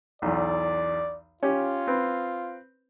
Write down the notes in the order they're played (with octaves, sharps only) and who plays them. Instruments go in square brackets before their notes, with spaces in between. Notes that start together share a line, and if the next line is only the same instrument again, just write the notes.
[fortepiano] B1 E2 [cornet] D5
[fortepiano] C#4 G4 [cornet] F4
[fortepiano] C4 B4